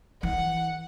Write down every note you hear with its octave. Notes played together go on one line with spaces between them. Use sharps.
E3 F#5